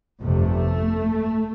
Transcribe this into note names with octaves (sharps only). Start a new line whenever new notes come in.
G1 F2 C3 A3